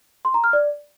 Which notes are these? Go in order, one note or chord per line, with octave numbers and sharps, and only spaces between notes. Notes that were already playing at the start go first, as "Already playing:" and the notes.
C6
A#5
F6
D5